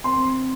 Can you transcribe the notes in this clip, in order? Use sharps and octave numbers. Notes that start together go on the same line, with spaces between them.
C4 C6